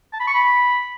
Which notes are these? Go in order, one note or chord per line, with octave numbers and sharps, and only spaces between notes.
A5
B5
C#6
B5